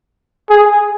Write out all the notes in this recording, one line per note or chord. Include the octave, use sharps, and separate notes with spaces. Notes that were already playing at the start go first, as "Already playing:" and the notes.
G#4